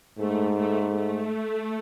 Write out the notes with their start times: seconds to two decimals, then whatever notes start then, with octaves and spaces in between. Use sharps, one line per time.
0.19 G#2 A3
0.58 A3
0.96 A3